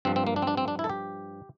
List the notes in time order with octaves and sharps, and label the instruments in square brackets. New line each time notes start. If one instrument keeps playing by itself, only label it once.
[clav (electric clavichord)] G2 F3 C4
C4
A#3
D4
C4
D4
C4
D4
E4
A4
G4